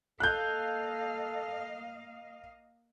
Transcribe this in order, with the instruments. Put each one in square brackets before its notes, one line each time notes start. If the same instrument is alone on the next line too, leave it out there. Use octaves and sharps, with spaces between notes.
[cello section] A#3 D#5 F5 [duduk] A4 [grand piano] F#6 G6